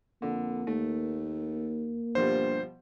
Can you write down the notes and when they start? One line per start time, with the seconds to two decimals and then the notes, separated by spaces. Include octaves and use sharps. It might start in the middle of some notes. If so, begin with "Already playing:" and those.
0.22 F2 D3 A#3
0.67 D#2 A3
2.15 G2 B2 F3 G3 C5